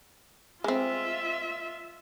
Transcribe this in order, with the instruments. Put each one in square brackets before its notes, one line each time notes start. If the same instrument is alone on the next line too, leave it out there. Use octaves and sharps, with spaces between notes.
[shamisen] G#3 C4 [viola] F4 E5